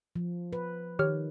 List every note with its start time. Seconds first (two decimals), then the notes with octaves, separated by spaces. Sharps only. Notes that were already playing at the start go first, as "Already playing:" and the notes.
0.16 F3
0.53 B4
0.99 D#3 G4 C#5 F6